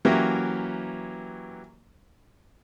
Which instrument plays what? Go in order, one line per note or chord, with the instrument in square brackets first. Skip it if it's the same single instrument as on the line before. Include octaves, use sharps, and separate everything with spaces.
[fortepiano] E3 F#3 A#3 C#4 G4 A#4